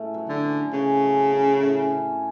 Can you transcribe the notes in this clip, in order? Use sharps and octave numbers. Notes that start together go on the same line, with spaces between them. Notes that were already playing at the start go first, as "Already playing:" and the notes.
Already playing: A2 A3 C#4
F#3
D3
C#4
C#3 C#4
F#3
C#4
A2
C#4